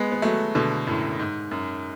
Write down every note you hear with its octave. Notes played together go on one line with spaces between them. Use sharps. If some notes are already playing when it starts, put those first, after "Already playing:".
Already playing: G#3 B3
B3
F#3 A3
B2 D3
F#2 A2
G#2
F#2